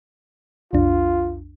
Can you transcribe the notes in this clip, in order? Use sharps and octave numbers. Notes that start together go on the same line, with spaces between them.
B1 F2 D4 F4